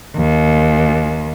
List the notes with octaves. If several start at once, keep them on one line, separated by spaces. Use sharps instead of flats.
D#2